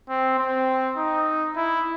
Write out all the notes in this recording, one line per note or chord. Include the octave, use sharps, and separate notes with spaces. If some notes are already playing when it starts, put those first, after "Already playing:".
C4
C4
D#4
E4